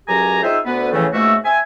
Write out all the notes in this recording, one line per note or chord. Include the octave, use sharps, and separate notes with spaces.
C#2 F#2 F#3 G4 G#5 A#5
C4 D#4 F4 G#4 C5 E5
D2 B3 B4
A2 C#3 E3 F3 A3
C#2 G#2 A3 A#3 F#4 E5
C4 E5 G#5